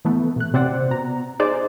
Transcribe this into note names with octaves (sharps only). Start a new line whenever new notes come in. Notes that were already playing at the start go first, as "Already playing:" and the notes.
E3 A3 B3
B2 F#6
C3 C4 C5 D5 F#5
B2 A#5
D#4 G#4 C5 D5